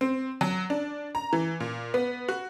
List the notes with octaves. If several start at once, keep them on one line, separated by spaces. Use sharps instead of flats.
C4
F#3
D4
A#5
E3
A#2
B3
F#4